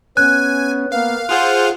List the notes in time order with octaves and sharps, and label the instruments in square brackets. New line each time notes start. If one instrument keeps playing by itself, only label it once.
[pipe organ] B3 C#4 [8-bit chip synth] G#5 [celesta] F#6
[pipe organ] A#3 B3 [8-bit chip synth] F5
[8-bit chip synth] F4 G#4 C5 [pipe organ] F#5 F6